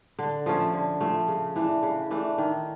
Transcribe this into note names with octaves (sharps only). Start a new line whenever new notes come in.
D3
F3 A3 C#4
D3
F3 A3 C#4
C#3
E3 A3 D4
C#3
E3 A3 D4
D#3